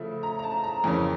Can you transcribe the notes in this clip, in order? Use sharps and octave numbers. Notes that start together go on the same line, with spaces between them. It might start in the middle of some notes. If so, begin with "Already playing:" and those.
Already playing: C#3 F3 A3 E4 E5
A#5
A#5
A5
A#5
F2 C#3 E3 A#3 C#4